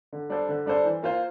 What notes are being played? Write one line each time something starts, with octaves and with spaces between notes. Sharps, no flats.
D3
G3 D4 A4 C5
D3
G3 D4 A4 C5
E3
A#3 F4 C5